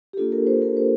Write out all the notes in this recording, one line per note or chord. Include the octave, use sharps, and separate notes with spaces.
G4
A#3 D4 F4 A4
A#4
C5
A#4
C5